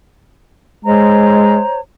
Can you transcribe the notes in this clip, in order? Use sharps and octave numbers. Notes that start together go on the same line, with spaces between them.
G#3 C5 C#5 A#5